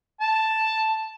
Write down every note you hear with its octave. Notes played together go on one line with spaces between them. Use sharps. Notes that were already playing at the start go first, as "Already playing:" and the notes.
A5